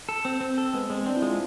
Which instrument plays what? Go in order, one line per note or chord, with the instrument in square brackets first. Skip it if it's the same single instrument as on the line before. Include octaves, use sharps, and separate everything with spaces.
[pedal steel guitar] A4
C4
C4
A4
[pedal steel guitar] G#3 [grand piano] B3
[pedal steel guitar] G#3 [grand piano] C4
[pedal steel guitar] C4 [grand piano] D4
[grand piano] E4
[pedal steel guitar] G#3 [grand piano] F4